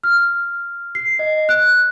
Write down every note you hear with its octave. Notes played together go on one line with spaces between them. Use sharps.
F6
C7
D#5
F#6